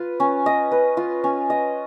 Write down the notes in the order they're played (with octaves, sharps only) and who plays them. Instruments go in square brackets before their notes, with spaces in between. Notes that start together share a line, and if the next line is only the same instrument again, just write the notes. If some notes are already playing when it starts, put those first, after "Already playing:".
Already playing: [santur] F4 B4
C#4
D#5
B4
F4
C#4
D#5